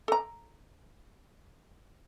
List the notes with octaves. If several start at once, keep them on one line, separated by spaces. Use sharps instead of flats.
A4 A#5